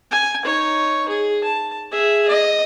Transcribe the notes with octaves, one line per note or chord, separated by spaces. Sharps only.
G#5
D#4 C#5
G#4
A5
G#4 E5
D#5